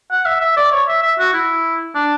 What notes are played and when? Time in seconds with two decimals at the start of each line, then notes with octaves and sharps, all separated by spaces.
0.11 F#5
0.25 E5
0.41 E5
0.57 D5
0.72 C#5
0.88 E5
1.03 E5
1.19 F#4
1.33 E4
1.95 D4